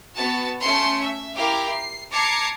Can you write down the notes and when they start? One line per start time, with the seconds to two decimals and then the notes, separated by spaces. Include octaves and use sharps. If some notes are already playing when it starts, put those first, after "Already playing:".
0.16 B3 F#4 A5
0.61 A3 C#4 C6 C#7
1.01 E5
1.36 E4 G4 A#4 F5 G5 D6
1.67 C7
2.12 A5 A#5 D6 G#6 C7 C#7